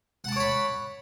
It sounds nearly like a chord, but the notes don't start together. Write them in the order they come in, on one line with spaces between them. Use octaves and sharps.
F#5 A5 D6 C#5 B5